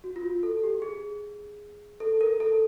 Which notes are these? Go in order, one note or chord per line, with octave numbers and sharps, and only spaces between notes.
F#4
F4
F#4
A4
G4
G#4
A4
A#4
A4